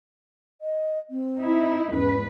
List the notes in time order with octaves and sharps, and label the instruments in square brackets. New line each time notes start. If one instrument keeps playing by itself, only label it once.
[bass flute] D#5
C4
[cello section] D#4 E4
[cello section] E2 G#2 B4 [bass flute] C#4